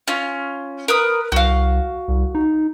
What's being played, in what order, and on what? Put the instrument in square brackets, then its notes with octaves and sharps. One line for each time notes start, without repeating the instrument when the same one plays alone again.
[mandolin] C#4 F4
A#4 B4 D#6
[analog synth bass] C2 [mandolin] F#4 F5
[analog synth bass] C2
D#4